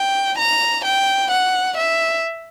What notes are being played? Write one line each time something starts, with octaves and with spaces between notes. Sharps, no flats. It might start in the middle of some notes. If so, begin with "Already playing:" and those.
Already playing: G5
A#5
G5
F#5
E5